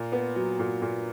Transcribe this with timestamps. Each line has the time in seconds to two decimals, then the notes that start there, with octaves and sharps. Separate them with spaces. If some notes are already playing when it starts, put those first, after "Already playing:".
Already playing: A#2
0.12 B3
0.36 F#3
0.59 A#2
0.82 A#2